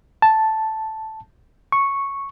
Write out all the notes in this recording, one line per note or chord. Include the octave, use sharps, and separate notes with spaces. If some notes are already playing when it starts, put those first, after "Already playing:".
A5
C#6